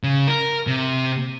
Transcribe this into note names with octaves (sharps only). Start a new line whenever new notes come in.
C#3
A#4
C3